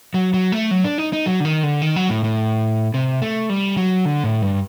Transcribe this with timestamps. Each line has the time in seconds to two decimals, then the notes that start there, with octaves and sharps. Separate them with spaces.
0.14 F#3
0.34 F#3
0.52 A3
0.71 F#3
0.84 D4
0.98 D#4
1.13 D#4
1.26 F#3
1.40 D3
1.45 D#3
1.63 D3
1.82 D#3
1.96 F#3
2.09 A2
2.24 A2
2.94 C3
3.22 A3
3.50 G3
3.77 F#3
4.05 D3
4.24 A2
4.42 G2